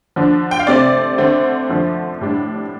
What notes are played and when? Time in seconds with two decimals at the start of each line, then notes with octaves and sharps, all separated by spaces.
0.16 D3 F3 D4
0.51 G5
0.59 F5
0.67 C3 A3 C4 D5
1.18 D3 A3 C4
1.69 D3 F3 A3
2.21 A2 G3 D4